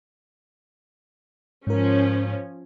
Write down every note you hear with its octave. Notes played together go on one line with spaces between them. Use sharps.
G#2 F3 C#4 A#4